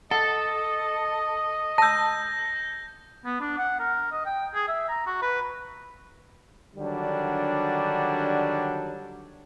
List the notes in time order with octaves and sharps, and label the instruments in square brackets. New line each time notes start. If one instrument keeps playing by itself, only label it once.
[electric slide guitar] A4 [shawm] D#5 [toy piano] F#5
[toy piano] A5 E6 [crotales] G6 A#6
[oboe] B3
D4
F#5
A#4
D#5
G5
G#4
E5
A#5
F#4
B4
[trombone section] D3 D#3 F#3 G3 D4